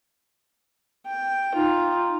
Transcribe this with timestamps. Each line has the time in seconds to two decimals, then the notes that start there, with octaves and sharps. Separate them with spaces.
1.06 G5
1.55 D#4 F4